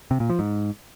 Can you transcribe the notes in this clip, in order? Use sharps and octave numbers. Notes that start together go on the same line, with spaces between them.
C3
A#2
F3
G#2